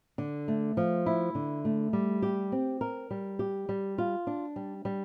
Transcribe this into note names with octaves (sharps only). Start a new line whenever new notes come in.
D3
A3
F3
E4
D3
A3
G3
G4
C4
A#4
G3
G4
G3
F4
D4
G3
G3